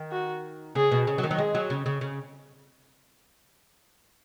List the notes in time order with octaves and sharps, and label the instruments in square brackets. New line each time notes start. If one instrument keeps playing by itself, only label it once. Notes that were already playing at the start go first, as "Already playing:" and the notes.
Already playing: [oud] D#3
[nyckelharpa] F#4
[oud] C#3 [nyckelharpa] G#4
[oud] B2
C#3
F#3
D#3
F#3
[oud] G#3 [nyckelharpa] G#4
[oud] F#3
C#3
C#3
C#3